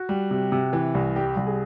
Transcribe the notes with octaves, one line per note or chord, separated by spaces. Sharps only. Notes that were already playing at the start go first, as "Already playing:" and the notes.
Already playing: F#4
G3
C3
C3
E3
C2
G3 G4
C2
G#4